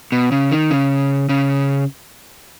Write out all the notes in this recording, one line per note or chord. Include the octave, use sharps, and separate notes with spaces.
B2
C#3
D#3
C#3
C#3